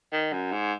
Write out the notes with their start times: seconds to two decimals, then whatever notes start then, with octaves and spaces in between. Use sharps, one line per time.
0.13 D#3
0.33 F#2
0.52 G#2